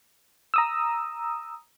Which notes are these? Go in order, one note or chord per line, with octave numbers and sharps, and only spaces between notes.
A#5 D#6 E6